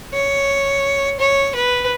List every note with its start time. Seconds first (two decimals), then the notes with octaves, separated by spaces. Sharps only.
0.13 C#5
1.19 C#5
1.55 B4